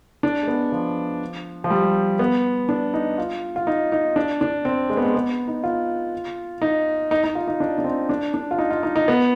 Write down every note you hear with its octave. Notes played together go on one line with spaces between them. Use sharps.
D4
G#3
B3
F3
F3
G3
B3
D4
D#4
F4
F4
D#4
D#4
D4
D4
C4
G#3
B3
G#3
B3
D#4
F4
D#4
D#4
D#4
F4
D#4
D4
D4
C4
D4
D4
F4
D#4
F4
D#4
D#4
B3